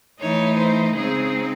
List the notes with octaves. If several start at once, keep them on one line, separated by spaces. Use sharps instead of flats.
E3 A3 D#4 C#5
C5
C#3 G#3 C4 D#4 G#4